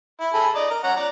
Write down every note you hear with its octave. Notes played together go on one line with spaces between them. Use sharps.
E4
G#4 A4 B5
D5 D#5 A#5
A#4
C#4 F#5 A#5
D5 A#5